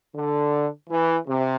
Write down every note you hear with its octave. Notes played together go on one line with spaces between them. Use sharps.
D3
E3
C3